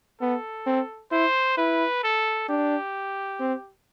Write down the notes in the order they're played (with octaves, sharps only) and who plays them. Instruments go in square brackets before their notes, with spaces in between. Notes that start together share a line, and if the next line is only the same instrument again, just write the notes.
[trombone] B3 [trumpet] A4
[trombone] C4
[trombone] E4 [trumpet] C5
[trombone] E4 [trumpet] B4
[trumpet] A4
[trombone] D4 [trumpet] G4
[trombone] C4